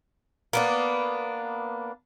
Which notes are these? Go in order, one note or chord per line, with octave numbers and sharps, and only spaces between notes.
A#3 B3 D4